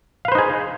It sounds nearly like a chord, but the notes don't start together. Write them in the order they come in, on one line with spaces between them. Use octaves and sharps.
F5 B4 C5 D#4 G#4